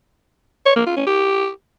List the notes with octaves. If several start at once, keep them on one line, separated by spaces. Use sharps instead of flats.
C#5
A#3
F4
C#4
G4